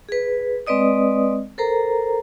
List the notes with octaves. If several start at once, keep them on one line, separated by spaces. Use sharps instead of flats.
G#4 B4
G#3 C4 B4 D5 D#5 D#6
A4 A#4 C5 A#5